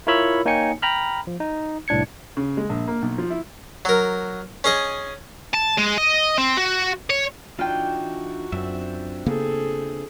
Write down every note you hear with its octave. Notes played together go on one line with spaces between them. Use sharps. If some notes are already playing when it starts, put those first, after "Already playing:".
E4 F4 A#4 C#5 B5 E6
A#3 D#4 C#5 G5 G#5 C#7
G5 A#5 B5 F6
F3
D#4
C2 A2 D4 G#6 C#7
C#3
G#3
A#1
A#3
B1
F3
E4
F#3 A#4
C#4 G#4 D#5
A5
G#3
D#5
C4
F#4
C#5
E3 D4 D#4 F4 F#4 G5
F#2 C4 D4 E5
C#3 A#3 B3 G#4 A4